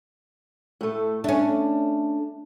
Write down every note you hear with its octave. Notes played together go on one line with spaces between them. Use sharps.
A2 A3
A3 C#4 D4